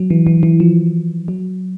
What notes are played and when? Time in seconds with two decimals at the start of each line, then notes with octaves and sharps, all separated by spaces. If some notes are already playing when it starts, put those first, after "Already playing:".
Already playing: F#3
0.10 E3
0.27 E3
0.43 E3
0.60 F3
1.28 F#3